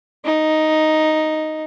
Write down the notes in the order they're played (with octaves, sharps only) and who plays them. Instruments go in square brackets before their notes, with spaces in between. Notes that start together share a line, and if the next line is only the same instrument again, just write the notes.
[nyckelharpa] D#4